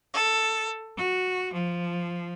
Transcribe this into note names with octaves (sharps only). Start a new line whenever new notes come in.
A4
F#4
F3